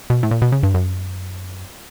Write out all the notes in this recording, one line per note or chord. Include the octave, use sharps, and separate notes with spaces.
B2
A2
A#2
B2
C#3
G2
F#2